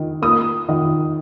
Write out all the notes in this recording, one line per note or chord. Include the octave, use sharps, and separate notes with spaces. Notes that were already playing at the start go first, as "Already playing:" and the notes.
Already playing: D#3
A#3 D#6
D#3